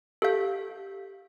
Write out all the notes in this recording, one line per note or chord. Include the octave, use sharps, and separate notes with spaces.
G4 A4 F5 G6